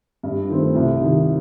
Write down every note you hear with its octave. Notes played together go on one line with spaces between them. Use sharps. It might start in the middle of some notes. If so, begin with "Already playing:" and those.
G2
D#3 A3 C4
C2
C3 D#3